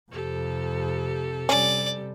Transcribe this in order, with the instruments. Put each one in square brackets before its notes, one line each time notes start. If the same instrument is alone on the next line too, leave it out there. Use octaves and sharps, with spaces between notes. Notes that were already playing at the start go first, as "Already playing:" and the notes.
[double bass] F2 C3 [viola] G4 A4
[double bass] C3 G3 [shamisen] C#4 [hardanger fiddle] D5